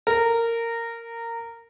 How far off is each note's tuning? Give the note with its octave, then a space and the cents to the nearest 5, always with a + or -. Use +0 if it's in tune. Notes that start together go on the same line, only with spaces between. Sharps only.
A#4 -15